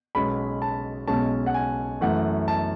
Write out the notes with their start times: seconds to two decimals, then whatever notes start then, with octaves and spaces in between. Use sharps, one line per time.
0.15 B1 B2 G#3 C#4 B5
0.62 A5
1.08 B1 B2 G#3 C#4 A5
1.46 F#5
1.54 G#5
2.01 F#2 E3 A3 F#5
2.48 A5